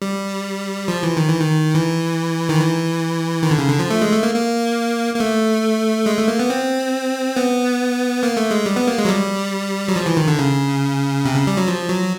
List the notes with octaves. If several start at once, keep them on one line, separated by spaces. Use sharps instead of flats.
G3
F3
E3
D#3
E3
D#3
E3
D#3
E3
D#3
D3
C#3
D3
F3
A3
G#3
A3
A#3
A#3
A#3
A3
G#3
A3
A#3
B3
C4
B3
A#3
A3
G#3
G3
B3
A#3
G#3
F#3
G3
F#3
F3
E3
D#3
D3
C#3
C3
C#3
G3
F#3
F3
F#3